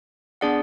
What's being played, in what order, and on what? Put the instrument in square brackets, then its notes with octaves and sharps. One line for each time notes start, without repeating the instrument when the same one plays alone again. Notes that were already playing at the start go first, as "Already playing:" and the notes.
[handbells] B3 D4 G#4 D5 F#5